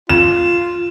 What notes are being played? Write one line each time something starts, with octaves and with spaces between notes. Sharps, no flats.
F4 E7